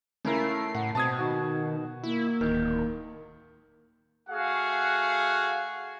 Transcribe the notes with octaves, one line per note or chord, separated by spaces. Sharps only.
C#3 A3 E4 A#4 C7
A2 F#5
B2 C4 A5 D#6 G#6
D#3 F#4
A#3 E4
D1 D#3
A3 F#4 G#4 F5 F#5